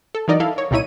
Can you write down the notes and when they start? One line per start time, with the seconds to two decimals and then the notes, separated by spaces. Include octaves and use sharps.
0.15 A4
0.28 E3 F#3 D#4 A#4 D5 D#5
0.40 E4 A4 F5
0.58 C#5
0.71 C2 A#2 D#4 E4 C#5 D#7